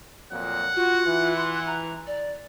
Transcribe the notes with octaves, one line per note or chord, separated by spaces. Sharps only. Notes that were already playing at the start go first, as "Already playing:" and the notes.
F2 A#2 F#3 F#5
F4 F#4
E3
C6
A#5
D5